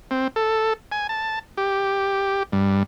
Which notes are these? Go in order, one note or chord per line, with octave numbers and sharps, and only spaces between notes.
C4
A4
G#5
A5
G4
G2